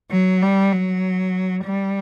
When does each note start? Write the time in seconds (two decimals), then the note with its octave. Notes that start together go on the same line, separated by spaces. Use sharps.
0.11 F#3
0.42 G3
0.72 F#3
1.65 G3